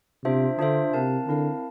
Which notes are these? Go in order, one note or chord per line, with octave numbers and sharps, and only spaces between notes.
C3 D4 F4 C5 E5
D3 D4 F4 C5 E5
C3 C4 E4 A#4 F5 A5
D3 C4 E4 A#4 F5 A5